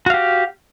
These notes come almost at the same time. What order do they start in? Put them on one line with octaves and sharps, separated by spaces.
F#4 F5 G4